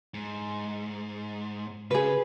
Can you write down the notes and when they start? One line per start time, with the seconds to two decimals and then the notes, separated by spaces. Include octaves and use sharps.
0.14 G#2
1.91 C#3 G#4 B4